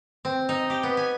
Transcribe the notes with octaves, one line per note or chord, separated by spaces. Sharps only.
C4
D#4
G4
B3
G#5